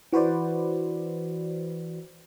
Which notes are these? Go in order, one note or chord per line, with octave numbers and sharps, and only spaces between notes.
E3 F#4 B4 C5 D5